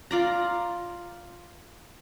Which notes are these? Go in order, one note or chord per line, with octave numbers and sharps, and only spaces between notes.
F4 D5 A#5